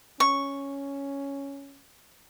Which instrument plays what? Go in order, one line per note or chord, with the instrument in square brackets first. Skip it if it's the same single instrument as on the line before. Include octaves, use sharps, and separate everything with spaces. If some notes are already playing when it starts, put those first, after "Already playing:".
[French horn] C#4 [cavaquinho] C#6